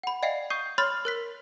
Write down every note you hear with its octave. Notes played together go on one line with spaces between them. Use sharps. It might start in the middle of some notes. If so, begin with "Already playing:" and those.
F#5 B5
D5 D#5 F5 G5 C7
C#6 D#6 G6 C7 D#7
C#5 B5 C6 F6 A6
A#4 F#6 B6